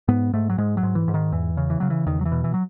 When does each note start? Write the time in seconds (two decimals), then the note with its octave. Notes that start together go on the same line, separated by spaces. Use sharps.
0.08 G#2 B3
0.33 G#2 A3
0.50 F#3
0.58 G#2 G#3
0.77 F#3
0.83 G#2
0.95 E3
1.08 G#2
1.14 D#3
1.32 E2 E3
1.57 C#3
1.70 E3
1.80 C#3 F#3
1.90 E3
2.06 E2 D#3
2.21 F#3
2.25 E3
2.32 B2
2.44 E3
2.54 F#3